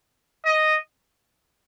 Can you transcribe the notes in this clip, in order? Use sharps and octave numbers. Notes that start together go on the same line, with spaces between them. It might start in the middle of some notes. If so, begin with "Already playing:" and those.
D#5